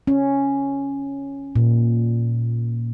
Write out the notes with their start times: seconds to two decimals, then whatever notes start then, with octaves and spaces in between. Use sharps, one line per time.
0.07 C#4
1.56 A#2